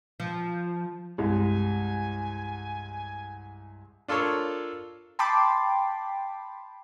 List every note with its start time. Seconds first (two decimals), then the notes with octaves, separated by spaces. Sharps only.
0.20 F3
1.18 C2 G2 G#3 G#5
4.08 D4 F4 A4 A#4 C#5
5.19 G5 A5 B5 C6 D6